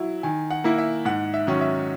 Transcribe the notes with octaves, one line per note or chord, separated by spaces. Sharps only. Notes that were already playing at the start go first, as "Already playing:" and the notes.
Already playing: F#3 E4
D#3 G#5
F#5
A#3 E4
E5
G#2 F#5
E5
D#3 F#3 C#4
E5